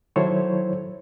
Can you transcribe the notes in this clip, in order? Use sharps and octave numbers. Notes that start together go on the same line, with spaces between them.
D#3 F#3 E4 A4 C5 C#5